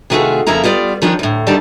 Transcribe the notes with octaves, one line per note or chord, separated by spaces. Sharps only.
C3 D#3 A3 F4 F#4 G#4
F2 C#3 A#3 E4 A#5
G3 B3 F4 D5
D#3 F3 C#4 D4
D2 A2
D2 D3 D#3 G3 D5 A5